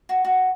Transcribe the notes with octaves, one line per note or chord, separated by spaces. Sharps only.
F#4
F#4